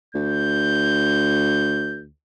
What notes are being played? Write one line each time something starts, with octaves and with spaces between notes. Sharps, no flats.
D2 G6